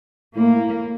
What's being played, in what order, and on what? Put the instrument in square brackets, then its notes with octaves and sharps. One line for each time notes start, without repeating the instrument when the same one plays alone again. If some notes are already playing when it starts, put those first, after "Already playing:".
[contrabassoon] A2 [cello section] A#3